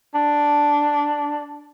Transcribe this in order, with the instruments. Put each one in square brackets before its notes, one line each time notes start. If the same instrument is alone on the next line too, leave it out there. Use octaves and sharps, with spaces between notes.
[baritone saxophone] D4